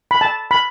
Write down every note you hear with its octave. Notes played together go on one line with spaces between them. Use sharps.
B5
A5
B5